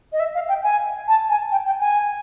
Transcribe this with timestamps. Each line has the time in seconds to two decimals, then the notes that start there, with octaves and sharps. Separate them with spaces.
0.13 D#5
0.20 E5
0.35 F5
0.49 G5
0.63 G#5
1.08 A5
1.29 G#5
1.52 G5
1.66 G5
1.80 G#5